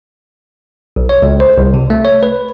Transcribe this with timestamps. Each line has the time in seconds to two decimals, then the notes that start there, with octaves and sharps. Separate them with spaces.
0.96 B1
1.09 C#5
1.22 C#2
1.40 C5
1.58 C2
1.74 C3
1.90 A3
2.05 C#5
2.23 B4